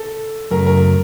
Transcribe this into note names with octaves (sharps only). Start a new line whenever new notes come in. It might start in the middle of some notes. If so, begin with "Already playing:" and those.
Already playing: A4
F#2 C#3 F#3 A3 A#4
A#4